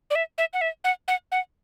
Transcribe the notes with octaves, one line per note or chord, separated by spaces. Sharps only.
D5
E5
E5
F#5
E5
F#5
F#5
F#5